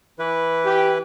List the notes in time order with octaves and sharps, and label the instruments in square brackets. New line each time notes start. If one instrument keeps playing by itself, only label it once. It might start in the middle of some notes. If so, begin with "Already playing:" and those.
[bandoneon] E3 E4 B4
[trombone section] G4